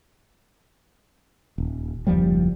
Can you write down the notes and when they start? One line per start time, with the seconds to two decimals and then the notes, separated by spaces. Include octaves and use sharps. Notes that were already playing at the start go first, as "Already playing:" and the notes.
1.58 D#1
2.07 F#1 D#2 F3 G3